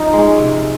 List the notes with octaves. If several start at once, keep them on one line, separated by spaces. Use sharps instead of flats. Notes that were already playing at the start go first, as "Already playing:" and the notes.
Already playing: F3 D#4
G#3
C#4
C3